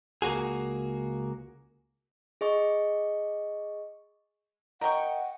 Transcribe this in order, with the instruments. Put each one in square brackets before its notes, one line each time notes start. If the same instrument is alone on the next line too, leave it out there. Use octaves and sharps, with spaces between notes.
[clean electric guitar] C#2 A#3 F#4 G#4
[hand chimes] G#4 D#5 C#6
[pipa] A#4 G5 [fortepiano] D#5 C#6 [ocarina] F#5